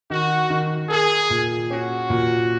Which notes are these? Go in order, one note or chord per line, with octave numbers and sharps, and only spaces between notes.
D#3 F#4
D#3
G#4 A#4
A#2
C#4 F#4
A#2